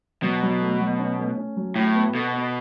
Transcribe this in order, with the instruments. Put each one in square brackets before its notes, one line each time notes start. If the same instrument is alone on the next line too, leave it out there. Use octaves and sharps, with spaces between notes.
[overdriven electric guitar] B2 [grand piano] F#3
[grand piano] F#3
A3
F#3
C#4
A3
C#4
F#3
[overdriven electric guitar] A2 [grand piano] F#4
[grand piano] B3
[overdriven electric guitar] B2 [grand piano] A4
[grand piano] B3